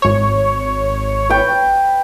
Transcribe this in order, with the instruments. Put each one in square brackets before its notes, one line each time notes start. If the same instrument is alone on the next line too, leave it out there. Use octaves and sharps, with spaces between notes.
[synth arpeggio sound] G#1 C#5
[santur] B4 G5